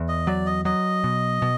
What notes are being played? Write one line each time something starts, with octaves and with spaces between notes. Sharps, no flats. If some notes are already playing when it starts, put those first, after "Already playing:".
Already playing: E2
D#5
F#3 D5
D#5
F#3 D#5
B2
B2